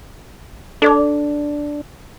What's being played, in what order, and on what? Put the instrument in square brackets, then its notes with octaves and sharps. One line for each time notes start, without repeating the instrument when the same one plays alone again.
[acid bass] D4 [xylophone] A4 D5 D6